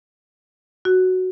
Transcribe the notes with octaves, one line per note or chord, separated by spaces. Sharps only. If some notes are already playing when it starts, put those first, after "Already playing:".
F#4